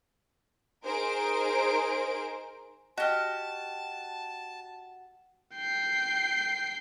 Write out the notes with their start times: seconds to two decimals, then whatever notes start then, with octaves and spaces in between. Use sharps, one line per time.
0.83 D#4 G#4 A#4 C5 D7
2.98 F#4 G4 D#5 A5 F6
5.55 G5 C7